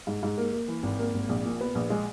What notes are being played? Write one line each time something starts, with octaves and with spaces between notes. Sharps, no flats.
G#2
G#2
A#3
A#3
E3
G#1
A#3
G#1
A#1
A#2
B3
A#1
G#3